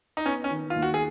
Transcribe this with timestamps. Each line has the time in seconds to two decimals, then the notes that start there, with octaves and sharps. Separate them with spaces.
0.17 D#4
0.25 B3 C#4
0.44 C#4
0.50 D#3
0.70 F4
0.76 D#2
0.82 F#4
0.94 G#4